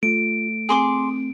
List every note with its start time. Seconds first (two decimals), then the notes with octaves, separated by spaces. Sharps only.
0.03 A3 F4 D7
0.69 C4 G#4 C6 D6